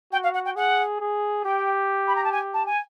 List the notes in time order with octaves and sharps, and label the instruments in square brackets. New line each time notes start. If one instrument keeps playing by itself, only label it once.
[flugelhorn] F#4 [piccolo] G5
[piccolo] F5
F#5
G5
[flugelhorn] G#4 [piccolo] F#5
[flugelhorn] G#4
[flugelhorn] G4 [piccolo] G5
[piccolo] B5
A#5
A5
G#5
A5
G#5